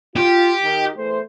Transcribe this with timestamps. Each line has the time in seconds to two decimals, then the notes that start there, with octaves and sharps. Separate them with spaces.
0.16 F4 G4
0.63 D#3
0.96 E2 A3 C5